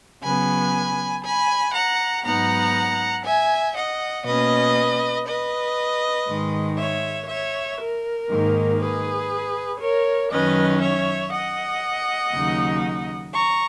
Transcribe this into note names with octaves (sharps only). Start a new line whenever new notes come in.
C#3 F#3 B3 G#5 B5
G#5 B5
F#5 A#5
G#2 F#3 B3 D#4 F#5 A#5
E5 G#5
D#5 F#5
B2 A#3 C#4 B4 D#5
B4 D#5
G#2 D#3 G#3
C#5 E5
C#5 E5
A#4
G#2 D#3 A#3
G#4 B4
A#4 C#5
F#2 D#3 F#3 C#4 B4 D#5
C#5 E5
D#5 F#5
D#2 C#3 F#3 A#3 D#4
A#5 C#6